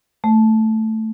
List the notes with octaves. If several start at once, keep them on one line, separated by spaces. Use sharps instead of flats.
A3